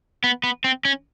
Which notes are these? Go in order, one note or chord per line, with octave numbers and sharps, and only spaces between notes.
B3
B3
C4
C#4